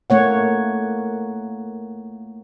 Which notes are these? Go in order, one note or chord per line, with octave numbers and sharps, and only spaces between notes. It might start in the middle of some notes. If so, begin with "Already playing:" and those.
A3 A#3 C#5 F#5